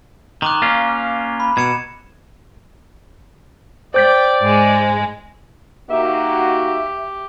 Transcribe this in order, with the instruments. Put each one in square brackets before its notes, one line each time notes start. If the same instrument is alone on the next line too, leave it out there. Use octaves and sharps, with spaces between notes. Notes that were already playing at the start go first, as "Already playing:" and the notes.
[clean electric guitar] D#3 [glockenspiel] A#5 D6 F#6
[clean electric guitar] A#3 C#4 F4
[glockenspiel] B5
[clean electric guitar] B2 [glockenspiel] G#6 C#7 E7
[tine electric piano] C5 G6 B6 [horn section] D5 [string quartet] G5
[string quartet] G#2 G#3
[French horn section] A#3 D#4 F#4 [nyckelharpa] G4 [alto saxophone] E5